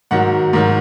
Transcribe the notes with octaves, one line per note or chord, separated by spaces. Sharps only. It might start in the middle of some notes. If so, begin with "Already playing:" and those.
G#2 D#3 F#3 F#5
G#2 D#3 F#3